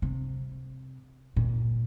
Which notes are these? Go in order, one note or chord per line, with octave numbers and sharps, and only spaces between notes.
C3
A#2